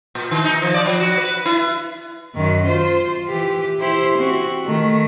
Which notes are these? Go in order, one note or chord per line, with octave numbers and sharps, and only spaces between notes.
A#2
D#3
D#4
F3
D5
F3
F#4
B4
E4
F#2 D#3
F4 C5
E3 G4
E4 G4 C5
C4 F#4
D#3 A3